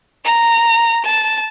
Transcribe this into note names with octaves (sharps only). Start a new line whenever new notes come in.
A#5
A5